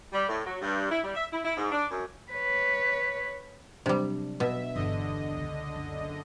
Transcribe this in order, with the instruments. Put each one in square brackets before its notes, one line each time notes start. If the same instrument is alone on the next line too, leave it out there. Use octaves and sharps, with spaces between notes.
[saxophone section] G3
A2
F#3
G2
E4
G3
E5
E4
E4
G#2
D4
F#2
[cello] B4 C#5
[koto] C3 G3 [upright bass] F#3 [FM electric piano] D4
[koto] B2 [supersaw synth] E5
[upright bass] G1 E2 [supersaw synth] D3 D#5
[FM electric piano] C#2
[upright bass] F#1